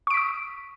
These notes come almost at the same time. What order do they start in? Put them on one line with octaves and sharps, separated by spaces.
C#6 D7 B6 D#6